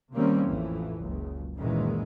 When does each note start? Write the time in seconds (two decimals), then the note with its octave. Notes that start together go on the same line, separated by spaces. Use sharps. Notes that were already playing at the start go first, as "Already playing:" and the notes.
0.13 C3 D#3 G3 A#3 C4 C#4
0.45 A1 F2 E3
0.98 F#1 C#2
1.56 F#2 A#2 D#3 E3 G#3